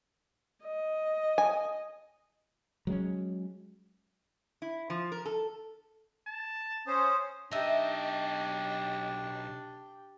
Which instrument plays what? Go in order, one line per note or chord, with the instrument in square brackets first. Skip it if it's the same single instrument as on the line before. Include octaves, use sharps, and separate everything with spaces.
[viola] D#5
[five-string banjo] G#5
[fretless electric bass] F#3 G#3 B3 C#4
[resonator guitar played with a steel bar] E4
F3
A#4
A4
[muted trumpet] A5
[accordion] C#4 C5 [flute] D#6
[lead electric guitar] B1 D#5 [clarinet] D4 [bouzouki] D#4 E5 [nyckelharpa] G4 G5